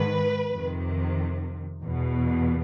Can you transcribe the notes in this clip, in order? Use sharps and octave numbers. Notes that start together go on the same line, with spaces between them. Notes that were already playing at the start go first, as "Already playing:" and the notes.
Already playing: G#2 D#3 B4
F2 C3 D#3
E2 B2